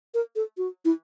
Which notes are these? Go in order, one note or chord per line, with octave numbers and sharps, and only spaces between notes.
A#4
A4
F#4
E4